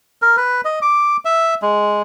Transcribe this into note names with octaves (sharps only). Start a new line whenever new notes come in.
A#4
B4
D#5
D6
E5
G#3